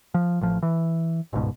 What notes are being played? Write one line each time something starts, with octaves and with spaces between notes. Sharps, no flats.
F3
A1 F3
E3
G1 C#2 G#2 B2